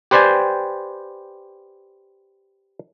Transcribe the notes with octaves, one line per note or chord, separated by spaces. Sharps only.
G4 B4 C5 D5 G5 G#5